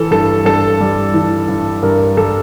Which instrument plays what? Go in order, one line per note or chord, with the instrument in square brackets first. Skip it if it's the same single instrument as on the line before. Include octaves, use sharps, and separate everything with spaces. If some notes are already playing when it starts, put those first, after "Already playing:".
Already playing: [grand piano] E3 A4
G2 A4
G2 A4
G3
E3
G2
G2 A#4
G3 A4